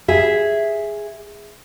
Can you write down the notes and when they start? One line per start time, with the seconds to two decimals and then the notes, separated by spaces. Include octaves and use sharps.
0.08 G#4 E5